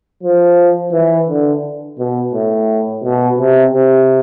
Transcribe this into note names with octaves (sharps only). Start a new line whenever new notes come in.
F3
E3
D3
B2
A2
B2
C3
C3